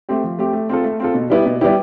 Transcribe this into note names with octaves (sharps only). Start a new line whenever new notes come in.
A3 C4 G4
F3
A3 C4 G4
A3
C4 F4 A4
A3
C4 F4 A4
B2
G3 B3 E4 G4
B2
G3 B3 E4 G4